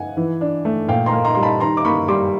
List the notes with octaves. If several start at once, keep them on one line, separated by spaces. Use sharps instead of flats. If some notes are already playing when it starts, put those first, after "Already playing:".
Already playing: F#5 G#5
E3
D4
A3
A#2 F5 G5
A#5 C6
A#3
A#5 C6
G3 C6
A5 B5
D#3 A#5 C6
D6
A#3 B5 C#6
G3 C6 D6